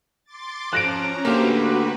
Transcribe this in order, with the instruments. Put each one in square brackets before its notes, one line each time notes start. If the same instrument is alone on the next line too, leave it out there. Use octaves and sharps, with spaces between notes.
[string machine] C6 D6 A6
[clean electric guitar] F3 [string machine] C#4 A#5 [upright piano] F#6 A#6 D7
[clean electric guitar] D3 A3 F5 [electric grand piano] A#3 G4 C5 [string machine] F#4 B4